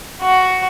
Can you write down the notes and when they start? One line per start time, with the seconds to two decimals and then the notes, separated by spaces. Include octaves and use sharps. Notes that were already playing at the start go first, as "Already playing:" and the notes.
0.21 F#4